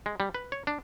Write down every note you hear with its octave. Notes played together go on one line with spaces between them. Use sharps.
G#3
G3
B4
C#5
D4